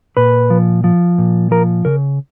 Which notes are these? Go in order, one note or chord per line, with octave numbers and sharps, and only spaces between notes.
A#2 B4
F3
F3
A#2
F3 A#4
C#3 A#4